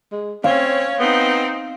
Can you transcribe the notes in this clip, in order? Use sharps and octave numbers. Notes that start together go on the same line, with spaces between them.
G#3
C4 C#4 C#5 F5
B3 C4 D#4